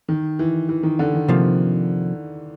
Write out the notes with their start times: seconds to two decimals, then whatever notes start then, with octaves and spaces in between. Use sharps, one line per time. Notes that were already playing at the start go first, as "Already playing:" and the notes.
0.09 D#3
0.39 E3
0.69 E3
0.83 D#3
0.99 D3
1.14 D#3
1.28 C3 F3 A#3